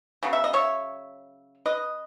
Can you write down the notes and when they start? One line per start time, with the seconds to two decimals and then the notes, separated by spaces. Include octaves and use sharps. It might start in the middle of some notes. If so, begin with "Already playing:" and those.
0.23 C#3 F#3 B3
0.33 E5
0.44 D#5
0.53 C#5 E5
1.66 B4 D#5